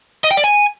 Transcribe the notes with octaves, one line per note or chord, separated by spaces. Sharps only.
D#5
G5
D5
G#5